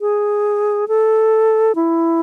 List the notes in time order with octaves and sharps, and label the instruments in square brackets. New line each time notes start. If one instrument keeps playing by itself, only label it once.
[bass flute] G#4
A4
E4